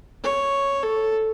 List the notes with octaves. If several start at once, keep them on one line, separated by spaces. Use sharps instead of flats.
C#5
A4